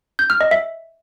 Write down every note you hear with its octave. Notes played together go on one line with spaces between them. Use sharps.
G6
F6
D#5
E5